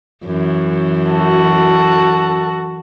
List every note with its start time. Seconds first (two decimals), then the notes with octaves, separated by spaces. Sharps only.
0.25 F#2 E3
1.09 F#4 A4